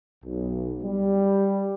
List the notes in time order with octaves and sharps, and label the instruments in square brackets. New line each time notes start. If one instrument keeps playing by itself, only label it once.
[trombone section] B1
G3